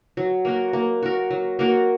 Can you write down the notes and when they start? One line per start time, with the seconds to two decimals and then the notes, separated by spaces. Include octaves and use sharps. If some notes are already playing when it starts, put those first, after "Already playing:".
0.17 F#3
0.45 A#3 F#4 A#4
0.73 A#3
1.03 F#4 A#4
1.31 F#3
1.59 A#3 F#4 A#4